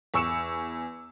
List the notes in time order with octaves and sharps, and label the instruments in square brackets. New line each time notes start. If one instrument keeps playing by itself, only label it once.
[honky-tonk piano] E2 C#6 E6 C#7 E7